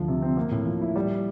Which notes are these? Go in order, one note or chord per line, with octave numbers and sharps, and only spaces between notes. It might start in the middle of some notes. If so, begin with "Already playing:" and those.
Already playing: D2 F3
C3
C4
A#3
A2
F3
E4
G3